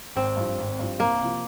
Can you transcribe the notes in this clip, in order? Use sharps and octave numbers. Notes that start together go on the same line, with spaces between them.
G#1 C4
G2 F3
G#1
G2 F3
C2 A#3
C3 F3